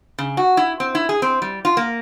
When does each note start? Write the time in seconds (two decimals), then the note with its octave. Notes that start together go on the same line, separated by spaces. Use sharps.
0.18 C#3
0.37 F#4
0.57 E4
0.80 C4
0.95 E4
1.09 G#4
1.22 C4
1.42 G3
1.65 F4
1.77 A#3